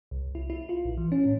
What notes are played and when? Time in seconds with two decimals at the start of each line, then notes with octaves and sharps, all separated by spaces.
0.11 C2
0.35 E4
0.50 E4
0.69 F4
0.85 A#1
0.97 E3
1.12 C#4
1.25 A2